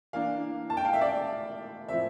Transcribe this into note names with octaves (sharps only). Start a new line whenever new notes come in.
E3 A#3 D4 F5
A5
G5
F5
E5
D5
A2 F3 C4 E5